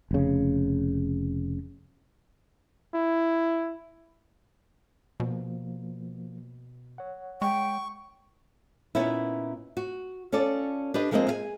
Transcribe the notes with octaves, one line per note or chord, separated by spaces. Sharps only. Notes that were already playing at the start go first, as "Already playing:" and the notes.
F1 C#3
E4
B2 F3 A#3
C#5 F#5
G#3 G5 C#6
A#2 B3 C#4 D#4 E4
F#4
C#4 F4 A4 D5
D4 G4 B4 D#5
F3 G#3 A#3 C4 G#4 D#5
G#4 F5 G#5